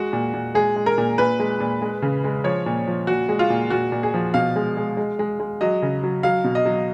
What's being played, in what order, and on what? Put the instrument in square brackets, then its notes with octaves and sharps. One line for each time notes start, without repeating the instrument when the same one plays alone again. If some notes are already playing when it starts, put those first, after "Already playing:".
Already playing: [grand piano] G#3 F#4
A#2
A#2
G#3 G#4
G#3
A#4
A#2
A#2 B4
G#3
A#2
G#3
C#3
G#3
F3 C#5
A#2
F3
A#2 F#4
G#3
F4
A#2
A#2 F#4
A#2
G#4
F3
B2 F5
G#3
G#3
G#3
G#3
G#3
F#3 D#5
C#3
F#3
F#3 F5
B2
D#5
F#3